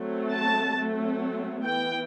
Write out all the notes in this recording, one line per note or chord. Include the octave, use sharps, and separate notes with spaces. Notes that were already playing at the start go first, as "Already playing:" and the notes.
Already playing: F#3 A3 C4
A5
F#3 A3 C4
E3 B3 G5